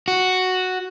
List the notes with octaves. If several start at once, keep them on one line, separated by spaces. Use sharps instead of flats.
F#4